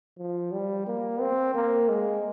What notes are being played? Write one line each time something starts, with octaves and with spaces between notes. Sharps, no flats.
F3
G3
A#3
C4
A#3
G#3